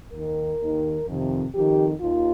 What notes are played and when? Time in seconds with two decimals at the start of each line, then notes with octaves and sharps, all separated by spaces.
0.13 D#2 D#3 A#4
0.61 D#2 D#3
1.07 F2 C3 D#3
1.55 F2 D#3 G4
2.01 D#2 D#3 F4